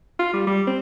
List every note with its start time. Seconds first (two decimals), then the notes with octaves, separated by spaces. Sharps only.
0.19 F4
0.33 G3
0.47 G3
0.67 C4